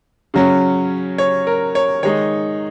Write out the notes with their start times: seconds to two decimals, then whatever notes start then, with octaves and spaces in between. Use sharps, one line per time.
0.34 C#3 F#3 C#4
1.18 C#5
1.47 A#4
1.75 C#5
2.03 D#3 G#3 D#4 C#5